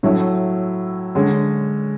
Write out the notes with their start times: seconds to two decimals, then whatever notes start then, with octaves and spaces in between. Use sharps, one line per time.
0.03 A2 F#3 A3 E4
1.15 D3 G#3 C#4